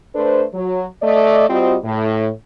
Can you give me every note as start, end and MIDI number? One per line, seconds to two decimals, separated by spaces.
0.15 0.45 57
0.15 0.45 62
0.15 0.45 69
0.15 0.45 71
0.15 0.45 72
0.54 0.85 54
1.03 1.49 57
1.03 1.49 74
1.03 1.49 75
1.49 1.77 55
1.49 1.77 60
1.49 1.77 65
1.49 1.77 66
1.49 1.77 72
1.49 1.77 75
1.84 2.28 45